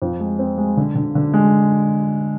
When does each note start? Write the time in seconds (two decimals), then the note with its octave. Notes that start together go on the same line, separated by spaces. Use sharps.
0.02 F2
0.20 G#3
0.39 C4
0.58 G#3
0.77 D3
0.95 D3
1.15 D3
1.33 G#3